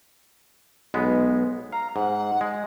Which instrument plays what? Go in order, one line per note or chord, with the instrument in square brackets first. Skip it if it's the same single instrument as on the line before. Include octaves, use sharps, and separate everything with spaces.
[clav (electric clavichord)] B1 G#3 B3
[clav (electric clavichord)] F5 [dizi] A#5
[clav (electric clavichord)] G#2 [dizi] F#5
[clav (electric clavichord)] G#3